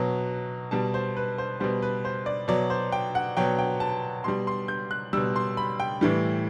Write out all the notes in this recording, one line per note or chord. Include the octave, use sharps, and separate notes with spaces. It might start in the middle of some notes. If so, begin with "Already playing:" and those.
Already playing: B2 F#3
B2 G3 A5
C5
B4
C5
B2 G3 C5
B4
C5
D5
B2 F#3 D5
C5
G5
F#5
B2 F#3 G5
G5
A5
B2 G3 C6
C6
G6
F#6
B2 G3 E6
C6
B5
G5
A2 E3 G3